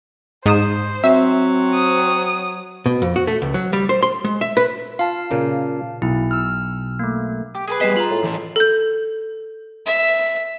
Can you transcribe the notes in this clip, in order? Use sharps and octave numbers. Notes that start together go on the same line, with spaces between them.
G#2 C5 D#6 E7
F#3 C4 E5
D#6
B2
F2
F#4
A3
C#2
F#3
G3
C5
C6
G#3
E5
B4
F4 F5 A5
A#2 C#3 A#3
B1 E4
E6 F6
A3 A#3
G4
G#4 A4 B4
G3 B3 D#5 B6 C7 E7
F4 A#5 F#7
A2
E3 A4
A4 G6
E5